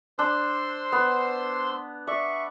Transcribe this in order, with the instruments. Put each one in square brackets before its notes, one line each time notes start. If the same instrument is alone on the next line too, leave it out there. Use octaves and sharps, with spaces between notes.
[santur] D4 [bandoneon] C5 C6 E6
[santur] B3
[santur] D5 [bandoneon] E5 C#6